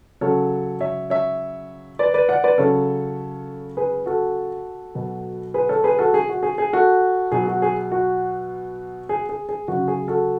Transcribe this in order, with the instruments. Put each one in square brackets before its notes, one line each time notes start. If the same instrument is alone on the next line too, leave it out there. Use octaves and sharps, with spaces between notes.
[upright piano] C#3 F#3 A4 C#5
C#5 E5
C#5 E5
B4 D5
B4 D5
D5 F#5
B4 D5
C#3 F#3 A4 C#5
G#4 B4
F#4 A4
B2 F#3
G#4 B4
A4 C#5
G#4 B4
F#4 A4
G#4
F#4
G#4
G#4
F#4 A4
B2 F#3 G#4
F#4
G#4
F#4
G#4
G#4
G#4
C#3 F#3 F#4
G#4
F#4 A4